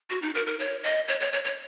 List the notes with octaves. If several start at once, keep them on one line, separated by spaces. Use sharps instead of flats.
F#4
D#4
A#4
A#4
C#5
D#5
C#5
C#5
C#5
C#5